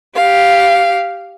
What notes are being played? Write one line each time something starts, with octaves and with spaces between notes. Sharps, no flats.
G4 F5